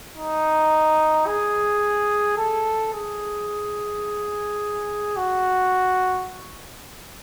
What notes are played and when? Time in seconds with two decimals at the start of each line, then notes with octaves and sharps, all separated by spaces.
0.16 D#4
1.27 G#4
2.37 A4
2.93 G#4
5.16 F#4